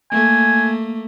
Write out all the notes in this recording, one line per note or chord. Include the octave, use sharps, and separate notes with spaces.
A3 A#3 G#5